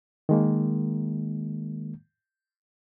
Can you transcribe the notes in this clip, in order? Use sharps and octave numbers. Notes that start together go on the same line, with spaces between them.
D#3 G#3 A#3